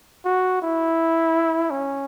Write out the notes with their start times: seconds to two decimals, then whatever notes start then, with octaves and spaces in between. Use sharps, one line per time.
0.25 F#4
0.62 E4
1.70 C#4